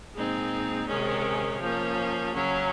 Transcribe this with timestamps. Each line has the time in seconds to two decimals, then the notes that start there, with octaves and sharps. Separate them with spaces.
0.15 A#2 G#3 C4 D#4
0.87 C3 D#3 G#3 C#4
1.60 F3 A#3 C#4
2.32 C#3 F#3 C#4